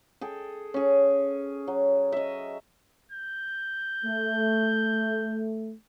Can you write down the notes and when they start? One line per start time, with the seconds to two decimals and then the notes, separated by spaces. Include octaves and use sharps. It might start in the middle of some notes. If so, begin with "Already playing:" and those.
0.21 G#4 A4 G5
0.74 C#4 G#4
1.67 F#3
2.12 D#5 E5
3.12 G6
4.05 A3